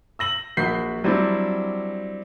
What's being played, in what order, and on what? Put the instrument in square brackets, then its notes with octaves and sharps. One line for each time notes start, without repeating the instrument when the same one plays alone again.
[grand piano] E6 A#6 F#7
A#1 F#4 A#4 G6 B6 C7
F#3 G3 C4 D4 E4